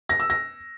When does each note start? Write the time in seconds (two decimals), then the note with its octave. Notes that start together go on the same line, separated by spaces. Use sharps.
0.09 A#6
0.20 E6
0.30 A#6